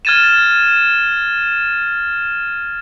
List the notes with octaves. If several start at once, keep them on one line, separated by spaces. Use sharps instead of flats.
F6 G#6 A6 D#7 E7